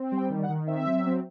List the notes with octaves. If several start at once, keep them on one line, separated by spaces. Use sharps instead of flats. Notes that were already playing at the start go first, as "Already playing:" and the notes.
Already playing: C4
G3
G5
D#3
F#5
D#3
C4 E5
F#3
C4